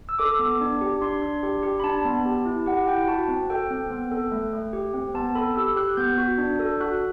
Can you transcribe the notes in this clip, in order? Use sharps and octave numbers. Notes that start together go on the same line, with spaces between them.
E6
A4 D6
B3
D4
G4
D4 C6
D4
G4
G4
B5
D4 A5
B3
G4
E4
G4 F#5
F#5
E4 G5
F#4 A5
C4
A4 G5
C4
B3
A4
A3
A3
G4
C4
B3 A5
A4 B5
G4 E6
G4 F#6
B3 G6
F#4
D4
A4
F#4 F#6